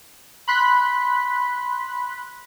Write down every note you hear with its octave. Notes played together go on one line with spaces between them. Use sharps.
B5 C6 F#6 B6